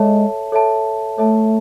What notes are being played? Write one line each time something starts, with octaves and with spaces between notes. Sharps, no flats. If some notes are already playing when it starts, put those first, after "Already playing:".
Already playing: G#3 A4 C#5 E5 A5
A4 C#5 E5 A5
A3 A4 C#5 E5 A5